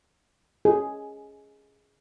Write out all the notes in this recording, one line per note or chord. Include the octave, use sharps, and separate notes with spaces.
G#4